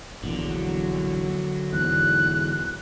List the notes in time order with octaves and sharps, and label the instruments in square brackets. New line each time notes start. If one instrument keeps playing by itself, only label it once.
[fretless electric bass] A#1 E2 A#2 [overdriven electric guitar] D3 [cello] F#3
[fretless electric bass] E2 G#2 [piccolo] F#6